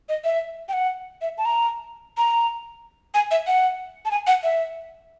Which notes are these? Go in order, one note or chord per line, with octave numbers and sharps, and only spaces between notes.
D#5
E5
G5
F#5
E5
A5
A#5
A#5
G#5
E5
F#5
A5
G#5
F#5
E5